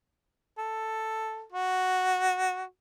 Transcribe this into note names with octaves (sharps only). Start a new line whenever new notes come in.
A4
F#4